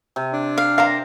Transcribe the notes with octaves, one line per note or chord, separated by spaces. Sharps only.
C3
D4
F5
A#4 C5 F5 A#5